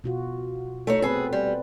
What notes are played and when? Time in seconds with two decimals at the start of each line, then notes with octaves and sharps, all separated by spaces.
0.04 B2 F4 F#4
0.87 A3 D#4 C#5
1.02 B3 C4 G#4 A4 B4
1.33 G3